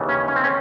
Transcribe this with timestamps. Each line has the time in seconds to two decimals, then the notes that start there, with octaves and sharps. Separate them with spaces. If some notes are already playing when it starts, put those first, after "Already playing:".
Already playing: D#2 C#3 E3
0.09 C#4
0.28 C#4
0.36 C4
0.44 C#4